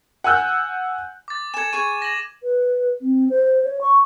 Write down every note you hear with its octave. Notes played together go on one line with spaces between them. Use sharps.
F#5 G#5 E6 F#6 G6
D6 A6
A4 G#5 G#6 E7
G#4 G#5 C#6 G#6 D#7
A#6 F#7
B4
C4
C5
C#5
C#6